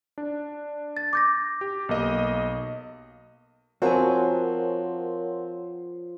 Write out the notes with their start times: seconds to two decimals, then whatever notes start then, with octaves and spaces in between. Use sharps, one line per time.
0.18 D4
0.97 A6
1.13 D6 G6 A#6
1.61 G4
1.89 B1 A#3 D#5
3.82 F3 C4 F#4 A#4 C#5 F#5 G#5